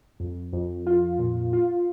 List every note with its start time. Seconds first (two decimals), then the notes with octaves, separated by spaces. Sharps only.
0.20 F2
0.53 F2
0.87 F4
1.19 A#2
1.53 F4